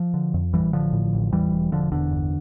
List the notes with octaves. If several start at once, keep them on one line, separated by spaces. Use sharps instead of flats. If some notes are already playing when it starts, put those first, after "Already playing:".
Already playing: F3
D3
F2
A1 E3 G3
A1 D3 F3
A2
A1
E2 E3 G3
E1
E1 D3 F3
E2 D3
G1